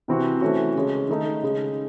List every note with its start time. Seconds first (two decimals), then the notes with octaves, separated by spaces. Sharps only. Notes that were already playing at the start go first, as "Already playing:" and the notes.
0.08 C3 E3 C4 F#4
0.41 E3 A3 C#4 F#4
0.76 C#3 G#3 C#4
1.09 D#3 A3 D#4
1.43 C#3 G#3 D#4